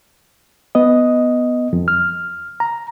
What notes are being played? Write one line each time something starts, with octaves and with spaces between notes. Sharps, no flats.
B3 D#5
F2
F6
A#5